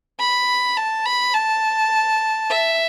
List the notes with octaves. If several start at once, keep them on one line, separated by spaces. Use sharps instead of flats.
B5
A5
B5
A5
E5